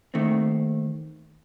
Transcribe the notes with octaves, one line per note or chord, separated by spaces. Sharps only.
D#2 D#3 A3 C4